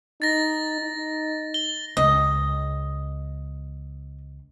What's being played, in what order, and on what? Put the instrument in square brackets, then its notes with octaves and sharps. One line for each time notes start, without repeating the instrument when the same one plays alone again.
[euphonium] D#4 [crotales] A6 A#6
[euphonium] D#4
[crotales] G7
[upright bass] C#2 [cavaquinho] D#5